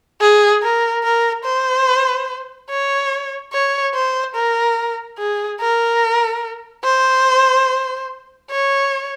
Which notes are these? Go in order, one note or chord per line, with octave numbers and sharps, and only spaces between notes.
G#4
A#4
A#4
C5
C#5
C#5
C5
A#4
G#4
A#4
C5
C#5